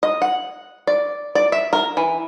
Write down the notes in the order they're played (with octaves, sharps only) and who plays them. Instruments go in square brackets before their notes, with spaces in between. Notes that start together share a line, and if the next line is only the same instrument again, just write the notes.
[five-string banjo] D#5
F#5
D5
D5
E5
A#4
E3